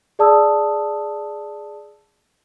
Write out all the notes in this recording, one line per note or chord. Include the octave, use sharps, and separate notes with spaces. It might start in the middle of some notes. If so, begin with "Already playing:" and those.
G#4 D5 A5 D#6 E6